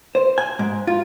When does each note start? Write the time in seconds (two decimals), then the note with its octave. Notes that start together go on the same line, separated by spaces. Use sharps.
0.15 C5
0.38 G#5
0.59 G#2
0.87 F4